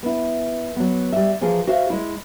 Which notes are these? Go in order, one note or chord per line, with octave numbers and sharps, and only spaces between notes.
B3 E4
F#3 B3
G3 E5
E3 F3 F4 G#4 A#4 C5
F#4 C5 E5 F5
G#3 E4